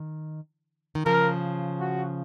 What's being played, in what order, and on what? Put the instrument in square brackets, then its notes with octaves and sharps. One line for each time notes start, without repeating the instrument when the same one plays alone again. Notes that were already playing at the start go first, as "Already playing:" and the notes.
Already playing: [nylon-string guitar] D#3
D#3
[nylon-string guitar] C#3 F3 [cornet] A#4
[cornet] F#4